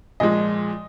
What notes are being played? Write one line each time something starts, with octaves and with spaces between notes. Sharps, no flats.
A#2 F3 G#3 D#5